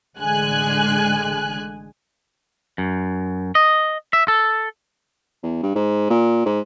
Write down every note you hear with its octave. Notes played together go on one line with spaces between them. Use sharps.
A1 D3 G#3 G#5 F#6
F#2
D#5
E5
A4
E2
G2
G#2
A#2
G#2